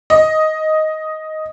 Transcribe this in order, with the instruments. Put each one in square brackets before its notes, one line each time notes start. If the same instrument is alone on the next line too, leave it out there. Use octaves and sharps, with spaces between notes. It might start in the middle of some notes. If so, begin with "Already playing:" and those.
[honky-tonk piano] D#5